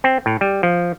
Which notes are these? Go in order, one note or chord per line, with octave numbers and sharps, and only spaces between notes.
C4
A2
G3
F3